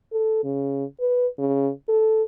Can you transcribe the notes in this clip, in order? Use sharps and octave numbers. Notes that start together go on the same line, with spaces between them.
A4
C#3
B4
C#3
A4